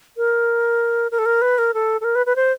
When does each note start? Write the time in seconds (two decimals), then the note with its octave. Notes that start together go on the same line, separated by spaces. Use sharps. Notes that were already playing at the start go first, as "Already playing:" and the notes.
0.17 A#4
1.11 A#4
1.19 A4
1.26 A#4
1.42 B4
1.58 A#4
1.74 A4
2.01 A4
2.04 A#4
2.15 B4
2.26 B4
2.36 C5